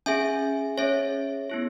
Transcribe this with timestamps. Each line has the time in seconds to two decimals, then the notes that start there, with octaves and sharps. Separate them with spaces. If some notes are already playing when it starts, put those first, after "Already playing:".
0.06 C#4 G#4 E5 G#5
0.77 C#4 G#4 C#5 E5
1.50 B3 E4 G#4